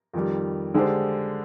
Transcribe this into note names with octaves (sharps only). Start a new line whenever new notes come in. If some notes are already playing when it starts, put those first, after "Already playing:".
F2 D#3 G3
D3 G#3 D4 G4 C5